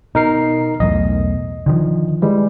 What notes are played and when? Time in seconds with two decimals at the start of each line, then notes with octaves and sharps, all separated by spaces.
0.15 B2 D#4 A#4 C7
0.80 B1 E2 A2 D#5
1.66 D3 D#3 F3
2.22 E3 G3 G#3